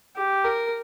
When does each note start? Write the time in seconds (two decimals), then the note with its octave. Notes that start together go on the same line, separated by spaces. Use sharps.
0.16 G4
0.44 A#4